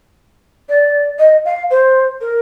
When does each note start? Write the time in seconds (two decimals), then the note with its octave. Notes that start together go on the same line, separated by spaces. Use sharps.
0.69 D5
1.19 D#5
1.45 F5
1.70 C5
2.21 A#4